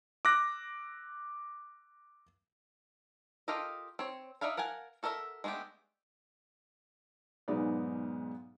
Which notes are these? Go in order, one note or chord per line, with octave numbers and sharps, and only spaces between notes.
D6 E6 F#6 A#6
F4 G4 A4 A#4 D#5
C4 C#5
D#4 D5 E5 F5 B5
A#4 F5 F#5 G#5 A5
F#4 A4 A#4 D#5 E5
G#3 A3 B3 D4 G4
B1 G#2 G#3 B3 D#4 D5